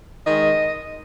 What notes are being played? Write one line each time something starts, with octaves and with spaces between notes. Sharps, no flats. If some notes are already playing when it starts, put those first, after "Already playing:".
D#3 G#3 D#5